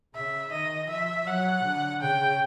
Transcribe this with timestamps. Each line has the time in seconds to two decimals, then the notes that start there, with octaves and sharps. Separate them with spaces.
0.14 C#3 E5
0.52 D#3 D#5
0.89 F3 E5
1.27 F#3 F#5
1.65 D3
2.01 C#3 G5